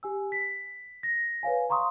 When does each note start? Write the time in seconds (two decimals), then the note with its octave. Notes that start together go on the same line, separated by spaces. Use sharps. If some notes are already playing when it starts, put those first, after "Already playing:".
0.03 G4 G#5 E6
0.32 B6
1.03 A#6
1.43 B4 C#5 F5 G#5
1.69 F5 A#5 C6 C#6 D#6